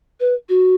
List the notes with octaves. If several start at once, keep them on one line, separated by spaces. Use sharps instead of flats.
B4
F#4